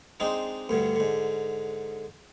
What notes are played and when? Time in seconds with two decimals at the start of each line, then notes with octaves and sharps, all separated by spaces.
0.20 G#3 C4 D4 D#4
0.69 D2 G2 D3
0.96 G#2 D3